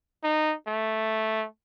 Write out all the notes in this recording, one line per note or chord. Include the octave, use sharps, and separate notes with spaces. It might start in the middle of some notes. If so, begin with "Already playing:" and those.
D#4
A3